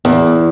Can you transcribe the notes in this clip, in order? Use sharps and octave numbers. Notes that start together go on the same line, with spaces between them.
E2